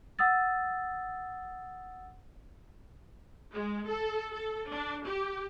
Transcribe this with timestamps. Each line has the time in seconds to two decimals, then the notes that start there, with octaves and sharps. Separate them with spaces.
0.19 F#5 D#6 E6 A6
3.52 G#3
3.86 A4
4.32 A4
4.71 D4
5.07 G4